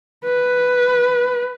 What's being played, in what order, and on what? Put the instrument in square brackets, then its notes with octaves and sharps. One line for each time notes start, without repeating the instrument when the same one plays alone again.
[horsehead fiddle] B4